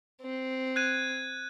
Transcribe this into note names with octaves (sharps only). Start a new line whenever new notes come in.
C4
F#6 G#6 D#7